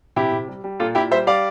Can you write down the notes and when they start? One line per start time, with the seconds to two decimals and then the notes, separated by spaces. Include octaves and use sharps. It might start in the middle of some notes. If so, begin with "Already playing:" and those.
0.16 C3 E4 G4
0.32 C3
0.48 G3
0.64 G3
0.80 A#2 F4 A4
0.95 A#2 E4 G4
1.11 G3 C5 E5
1.27 G3 D5 F5